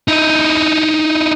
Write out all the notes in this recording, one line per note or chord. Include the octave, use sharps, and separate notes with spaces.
D#4 E4